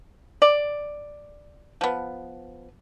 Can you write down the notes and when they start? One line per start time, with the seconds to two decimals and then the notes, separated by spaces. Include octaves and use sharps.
0.42 D5
1.81 F3 B3